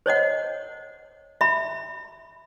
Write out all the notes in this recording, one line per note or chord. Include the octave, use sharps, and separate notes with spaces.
C5 C#5 D#5 F#5
E5 B5